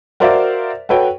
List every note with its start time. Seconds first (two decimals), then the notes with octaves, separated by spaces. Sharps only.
0.20 F#4 A#4 C5 D5 E5 F5
0.89 F#4 A4 B4 C#5 G5